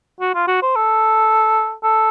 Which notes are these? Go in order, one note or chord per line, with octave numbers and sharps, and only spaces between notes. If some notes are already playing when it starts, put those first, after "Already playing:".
F#4
F4
F#4
C5
A4
A4